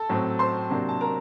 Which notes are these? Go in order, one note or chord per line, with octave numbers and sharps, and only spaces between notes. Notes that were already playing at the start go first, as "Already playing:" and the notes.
Already playing: A4 A5
A2 F#3 C4
C5 C6
C3 F#3 A#3 D4
A5
A#4 A#5